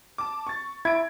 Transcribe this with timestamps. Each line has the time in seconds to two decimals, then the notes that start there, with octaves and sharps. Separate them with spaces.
0.18 A5 D6
0.47 C#6 A6
0.85 E4 G#6 D7